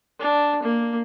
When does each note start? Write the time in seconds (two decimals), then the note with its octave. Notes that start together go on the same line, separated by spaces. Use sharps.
0.19 D4
0.63 A#3